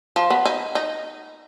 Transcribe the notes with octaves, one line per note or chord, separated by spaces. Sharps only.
F3
B3
D#4
D#4